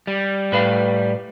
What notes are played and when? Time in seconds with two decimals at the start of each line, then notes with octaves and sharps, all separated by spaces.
0.07 G3
0.52 A2 B4 F5